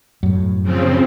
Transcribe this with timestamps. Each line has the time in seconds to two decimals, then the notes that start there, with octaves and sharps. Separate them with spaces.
0.23 F#2 A2
0.63 C#3 F3 C4